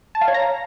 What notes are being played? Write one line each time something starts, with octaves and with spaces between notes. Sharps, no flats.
A5
F5
C#5
A#5